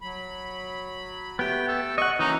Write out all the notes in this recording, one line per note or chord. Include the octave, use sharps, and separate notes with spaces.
F#3 B5
A3 B3 G4 G5
A4
D#5 F#5 C#6
E3 A#3 C#4 D#4 F#4 A#5